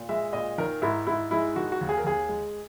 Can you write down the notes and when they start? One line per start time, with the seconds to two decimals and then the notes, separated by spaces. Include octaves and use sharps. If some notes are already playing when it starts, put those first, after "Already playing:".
Already playing: A#2
0.09 G#3 E5
0.33 A#2 D#5
0.58 D#3 A#4
0.82 G#2 E4
1.07 G#2 E4
1.31 G#3 E4
1.56 D#3 F#4
1.72 F#4
1.81 D#2
1.89 G#4
1.97 A#4
2.05 D#2 G#4
2.29 G#3